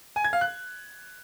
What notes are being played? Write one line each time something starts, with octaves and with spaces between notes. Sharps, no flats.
G#5
G#6
F5
F#6